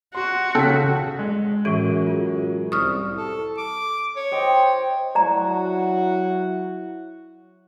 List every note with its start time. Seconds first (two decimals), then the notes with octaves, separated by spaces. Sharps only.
0.15 F#4 C6
0.55 C#3 A4 G5 B6
1.19 G#3
1.65 F#2 A2 E3 G#4 D7 D#7
2.07 F4 G#4
2.72 C2 C#6 D#6 F6
3.18 A4
3.58 D6
4.16 C#5
4.32 C5 D#5 G5
5.15 F#3 E4 F#4 D5 A#5